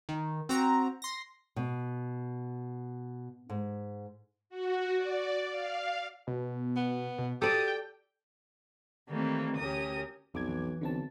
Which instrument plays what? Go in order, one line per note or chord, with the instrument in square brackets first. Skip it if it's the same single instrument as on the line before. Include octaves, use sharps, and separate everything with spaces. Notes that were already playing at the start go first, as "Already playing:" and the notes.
[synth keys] D#3
C4 F#4 A#5
C6 A#6
[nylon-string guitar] B2
G#2
[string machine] F#4
D5
F5
[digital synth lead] B2
[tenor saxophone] B3
[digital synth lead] B2
[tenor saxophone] G4 [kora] A4 D5 [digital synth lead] D#6
[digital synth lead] G5
[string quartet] D#3 E3 G3 A3 A#3 C4
D2 C#4 G4 A#4 D#6
[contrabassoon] B1 [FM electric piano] F2 D6 G#6
[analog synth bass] E3
[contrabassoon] B1 [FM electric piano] D3 C4 A5